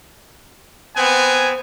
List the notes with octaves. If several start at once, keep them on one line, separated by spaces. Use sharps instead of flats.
B3 C4 G#5